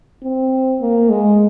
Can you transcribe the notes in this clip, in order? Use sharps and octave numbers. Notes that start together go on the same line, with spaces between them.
C4
A#3
G#3